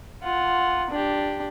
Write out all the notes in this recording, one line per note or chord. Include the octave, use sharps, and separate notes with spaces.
F4 F#5
D4 G4